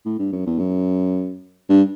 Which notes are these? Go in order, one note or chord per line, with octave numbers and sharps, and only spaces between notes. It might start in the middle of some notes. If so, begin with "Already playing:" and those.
A2
G2
F#2
E2
F#2
G2